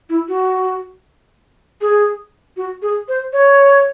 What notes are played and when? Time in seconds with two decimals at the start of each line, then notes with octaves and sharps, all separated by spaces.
0.10 E4
0.28 F#4
1.81 G#4
2.57 F#4
2.82 G#4
3.08 C5
3.33 C#5